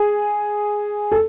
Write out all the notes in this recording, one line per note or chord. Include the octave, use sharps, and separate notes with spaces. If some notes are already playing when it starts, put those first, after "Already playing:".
Already playing: G#4
A4